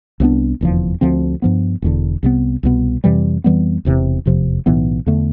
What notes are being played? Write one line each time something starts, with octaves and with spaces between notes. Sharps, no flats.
C2 B2 B3 D4
F1 E2 D3 F3
D2 D3 F3 C4
G2 F3 B3
E1 E2 D3
C2 C3 F3 B3
C2 B2 B3
F2 C3 E3 G3
F2 E3 G3 B3
E1 E2 C3
F1 E2 C3 F3
B1 A2 E3 B3
E2 D3 A3